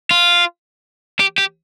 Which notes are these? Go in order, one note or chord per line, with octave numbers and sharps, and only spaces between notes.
F4
G4
G4